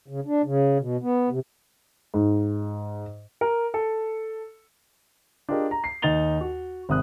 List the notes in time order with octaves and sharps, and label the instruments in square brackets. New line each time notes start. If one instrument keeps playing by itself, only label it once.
[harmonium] C#3
D4
C#3
B2
B3
C3
[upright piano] G#2
[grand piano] A#4
A4
D4 F4 G4 G#4 A#4 D#5
A#5
C7
D#2 D#4 A6 F7 G7
F#4
G#1 C3 D#6 F#6